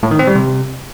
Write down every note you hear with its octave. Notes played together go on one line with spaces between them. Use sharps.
A2
D#3
C4
G3
C3